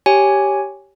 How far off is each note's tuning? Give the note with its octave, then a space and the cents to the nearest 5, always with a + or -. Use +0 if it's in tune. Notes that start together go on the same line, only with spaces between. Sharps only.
G4 -5 C#5 +0 G#5 +0